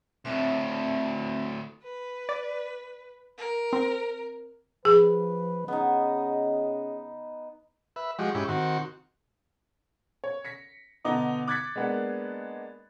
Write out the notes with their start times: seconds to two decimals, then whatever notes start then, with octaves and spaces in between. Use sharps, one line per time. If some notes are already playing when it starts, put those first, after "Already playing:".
0.25 D2 A2 C4 E5
1.83 B4
2.29 D5
3.38 A#4
3.73 C4
4.85 F3 G#4 B4
5.68 C#3 B3 D#4 D#5
7.96 B4 E5
8.19 F3 G#3 F#4 G4 D#5
8.35 G#2 C#4 E4 G4
8.48 D#3 C4 F#4
10.24 C#5
10.45 A#6 B6 C#7
11.05 B2 D3 B3 D#4 D#5 D6
11.48 D6 F#6 G#6 A6 B6 C#7
11.76 G#3 A#3 B3 D4